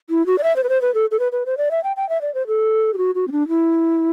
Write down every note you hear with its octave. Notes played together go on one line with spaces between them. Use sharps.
E4
F#4
D5
E5
C5
B4
C5
B4
A4
A4
B4
B4
C5
D5
E5
G5
G5
E5
D5
C5
A4
G4
F#4
F#4
C4
D4
E4